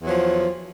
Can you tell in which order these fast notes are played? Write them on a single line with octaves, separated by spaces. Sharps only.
E2 F#3 F3